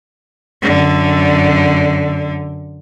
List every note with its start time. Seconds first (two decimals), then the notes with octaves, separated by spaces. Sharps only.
0.62 F#2 D3